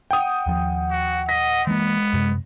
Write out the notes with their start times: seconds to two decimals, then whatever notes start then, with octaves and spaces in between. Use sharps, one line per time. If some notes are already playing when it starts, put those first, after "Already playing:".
0.11 F#5 G5 D#6
0.47 D#2 F3
0.91 F#4
1.29 D#5 A#6 B6
1.67 E3 G#3 A#3 B3
2.13 F#2 C3